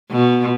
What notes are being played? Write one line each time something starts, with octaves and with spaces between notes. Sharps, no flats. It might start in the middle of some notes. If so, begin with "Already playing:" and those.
B2